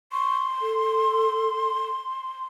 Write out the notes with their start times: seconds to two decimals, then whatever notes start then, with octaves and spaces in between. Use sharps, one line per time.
0.12 C6 C#6
0.61 A4